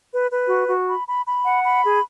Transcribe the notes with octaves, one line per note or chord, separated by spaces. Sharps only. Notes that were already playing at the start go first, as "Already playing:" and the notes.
B4
B4
F#4
F#4
B5
B5
B5
F#5
B5
G#4